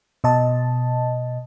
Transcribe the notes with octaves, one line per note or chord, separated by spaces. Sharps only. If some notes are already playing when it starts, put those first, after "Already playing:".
B2 D#5 A5